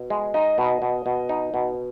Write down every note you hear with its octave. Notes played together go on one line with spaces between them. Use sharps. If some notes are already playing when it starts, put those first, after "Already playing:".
Already playing: B2
G#3
D#4 D#5
B2
B2
B2
D#4
B2